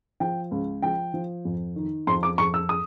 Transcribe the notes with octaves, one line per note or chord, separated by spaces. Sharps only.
F3 G5
C#2
F3 G5
F3
F2
D#3
F2 C6
D6
F2 C#6
E6
D#6